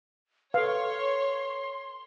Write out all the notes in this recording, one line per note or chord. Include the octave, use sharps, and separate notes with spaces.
A4 B4 C#5 F5 C6